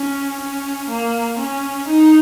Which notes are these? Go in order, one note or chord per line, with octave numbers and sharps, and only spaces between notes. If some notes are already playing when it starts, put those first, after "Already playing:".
Already playing: C#4
C#4
A#3
C#4
D#4